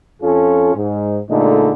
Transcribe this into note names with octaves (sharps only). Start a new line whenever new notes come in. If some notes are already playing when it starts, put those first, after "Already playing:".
F2 C#4 F4 A4
G#2
A#2 D3 G#3 A3 D#4